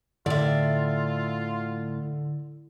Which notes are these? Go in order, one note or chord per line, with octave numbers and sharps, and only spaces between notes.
A2 D3 F4 D5 E5